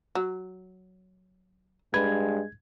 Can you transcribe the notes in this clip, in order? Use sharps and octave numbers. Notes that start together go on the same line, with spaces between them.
F#3
G2 G#3 B4 G#6